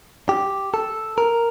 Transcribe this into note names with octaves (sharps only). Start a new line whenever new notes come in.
G4
A4
A#4